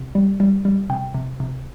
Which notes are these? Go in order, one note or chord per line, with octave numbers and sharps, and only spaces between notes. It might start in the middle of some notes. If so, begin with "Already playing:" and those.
Already playing: C3
G3
G3
G3
C3 G5
C3
C3